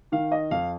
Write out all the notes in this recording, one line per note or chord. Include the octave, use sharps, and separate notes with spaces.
D#3 F5
D#5
F2 F5